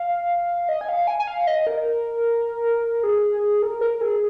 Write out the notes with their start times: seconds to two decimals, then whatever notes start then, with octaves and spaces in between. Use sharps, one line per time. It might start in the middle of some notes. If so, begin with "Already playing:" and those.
Already playing: F5
0.69 D#5
0.81 G#5
0.89 F5
1.07 G#5
1.20 G#5
1.27 F5
1.47 D#5
1.67 A#4
3.03 G#4
3.62 A#4
3.81 A#4
4.01 G#4